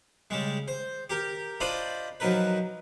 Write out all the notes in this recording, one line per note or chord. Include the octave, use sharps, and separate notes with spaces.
C#3 G3 G#3
C5
G4 A#4
D4 F4 C5 D5 D#5 B5
F3 F#3 D#4 A#4 B4